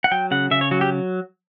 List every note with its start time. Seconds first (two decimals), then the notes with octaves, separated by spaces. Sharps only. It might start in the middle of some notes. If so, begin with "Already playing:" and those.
0.04 F#5
0.11 F#3 G5
0.31 C#3 F#5
0.51 C#3 E5
0.61 C#5
0.71 F#3 F#4
0.81 G4